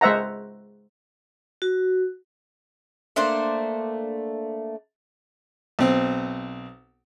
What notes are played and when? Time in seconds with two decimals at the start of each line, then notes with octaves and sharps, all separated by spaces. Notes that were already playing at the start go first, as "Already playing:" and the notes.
0.01 G#3 C5 E5 F#5 A#5
1.62 F#4
3.16 A3 A#3 D4 C5
5.79 B1 C4